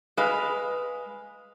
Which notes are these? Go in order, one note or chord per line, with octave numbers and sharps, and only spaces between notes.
G#3 B4 F5